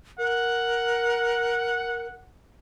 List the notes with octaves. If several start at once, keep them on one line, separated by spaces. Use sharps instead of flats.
A#4 F#5